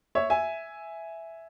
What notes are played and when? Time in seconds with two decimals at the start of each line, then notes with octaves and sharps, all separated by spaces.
0.15 C#5 E5
0.30 E5 G#5